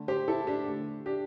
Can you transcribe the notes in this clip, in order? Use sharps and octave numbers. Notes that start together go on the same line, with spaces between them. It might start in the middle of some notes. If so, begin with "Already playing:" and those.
Already playing: D3 A3
G4 C5
E4 A4
D4 G4
D3 A3
D4 G4